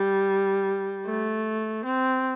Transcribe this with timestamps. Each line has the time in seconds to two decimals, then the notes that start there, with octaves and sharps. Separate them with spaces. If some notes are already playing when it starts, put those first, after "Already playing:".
Already playing: G3
1.05 A3
1.85 C4